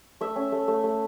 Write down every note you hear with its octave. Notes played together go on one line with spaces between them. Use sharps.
A3 E5
C#4
A3
A3
A3